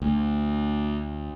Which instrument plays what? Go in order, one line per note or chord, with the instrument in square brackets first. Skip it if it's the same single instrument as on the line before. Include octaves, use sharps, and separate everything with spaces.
[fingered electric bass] D2